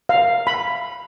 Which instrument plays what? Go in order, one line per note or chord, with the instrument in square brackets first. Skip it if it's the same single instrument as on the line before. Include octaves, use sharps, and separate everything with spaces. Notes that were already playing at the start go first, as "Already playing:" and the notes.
[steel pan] F5
B5